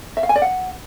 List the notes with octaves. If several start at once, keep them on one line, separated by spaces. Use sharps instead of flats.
E5
F5
G#5
D5
F#5